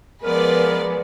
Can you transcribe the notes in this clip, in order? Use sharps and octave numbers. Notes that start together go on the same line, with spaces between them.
F3 G#3 B3 A#4 B4 D5